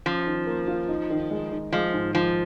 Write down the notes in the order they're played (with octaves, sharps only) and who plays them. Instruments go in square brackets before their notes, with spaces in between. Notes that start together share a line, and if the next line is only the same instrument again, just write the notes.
[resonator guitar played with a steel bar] F3 [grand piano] C#4
[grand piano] D#3
A#3
F4
D#4
D#3
G#3
D#3
[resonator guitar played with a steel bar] F3 [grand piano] G#3
[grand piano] G#2
[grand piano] D#3 [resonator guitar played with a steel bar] F3